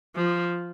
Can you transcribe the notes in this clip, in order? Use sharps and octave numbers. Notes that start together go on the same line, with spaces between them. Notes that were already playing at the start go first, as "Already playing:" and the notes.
F3